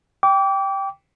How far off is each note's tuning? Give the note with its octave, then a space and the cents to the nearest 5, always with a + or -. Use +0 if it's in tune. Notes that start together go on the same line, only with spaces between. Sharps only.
G5 +0 D6 -30